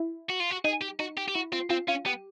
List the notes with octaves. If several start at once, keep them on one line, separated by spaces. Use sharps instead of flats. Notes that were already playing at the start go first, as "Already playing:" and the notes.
Already playing: E4
F#4
F4
F#4
D#4 G#4
G4
D#4 F#4
G4
G4
E4 F#4
C4 F4
C4 F4
C#4 F4
B3 G4